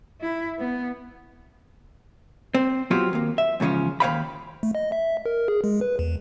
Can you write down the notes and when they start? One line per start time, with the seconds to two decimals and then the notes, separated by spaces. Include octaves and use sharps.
0.21 E4
0.59 B3
2.55 C4
2.91 F#3 B3 C4 F4 G4 C5
3.13 D#2 A#3
3.38 E5
3.60 E2 G#2 C#3 F3 C#4
4.00 D#2 C5 C#5 F5 G5 B5
4.63 A3
4.75 D#5
4.92 E5
5.26 A#4
5.48 G#4
5.64 G#3
5.81 B4
5.99 E2